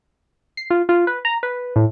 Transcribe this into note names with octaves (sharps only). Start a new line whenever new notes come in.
C7
F4
F4
B4
A#5
B4
A2